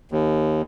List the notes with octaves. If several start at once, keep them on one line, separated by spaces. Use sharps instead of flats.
D#2